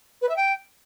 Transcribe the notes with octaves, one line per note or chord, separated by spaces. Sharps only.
B4
E5
G5